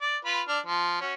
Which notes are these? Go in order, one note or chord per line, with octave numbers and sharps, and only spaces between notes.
D5
F4 B4 B5
D4 F6
F3
C#4 F#4